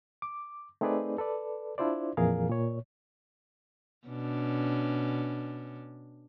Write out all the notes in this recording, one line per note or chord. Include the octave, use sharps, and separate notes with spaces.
D6
A3 C4 D#4 G#4 B4 D5
A4 B4 D5
D4 E4 F4 C5 D5
F2 A#2 E3 G#4 A#4 F5
A#2 C#5
B2 C#4 D4